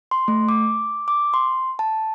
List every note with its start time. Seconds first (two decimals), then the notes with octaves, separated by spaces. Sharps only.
0.11 C6
0.28 A3
0.49 D6
1.08 D6
1.34 C6
1.79 A5